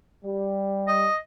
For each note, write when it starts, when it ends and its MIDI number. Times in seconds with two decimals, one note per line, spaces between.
0.24 1.05 55
0.88 1.17 75